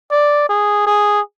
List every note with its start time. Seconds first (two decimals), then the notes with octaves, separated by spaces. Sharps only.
0.12 D5
0.49 G#4
0.87 G#4